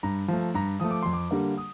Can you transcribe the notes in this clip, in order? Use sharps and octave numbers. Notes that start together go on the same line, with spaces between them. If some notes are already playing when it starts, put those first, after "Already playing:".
G2 A#5
F3 A3
G2 A#5
F3 A3 D#6
D6
F2 C6
D6
D3 G3 A#3
D#6